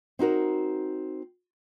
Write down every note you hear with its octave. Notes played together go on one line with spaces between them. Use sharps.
C4 D#4 F#4 A#4